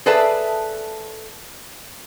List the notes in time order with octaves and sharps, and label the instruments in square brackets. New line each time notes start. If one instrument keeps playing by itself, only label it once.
[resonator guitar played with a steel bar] G#4 A4 B4 D5 E5 A5